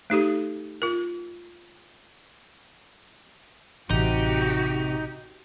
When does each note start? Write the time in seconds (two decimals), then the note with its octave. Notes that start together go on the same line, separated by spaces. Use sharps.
0.10 A3 D#4 G4 A4
0.82 F4 A#4
3.90 A1 C3 D#4 F#4 G4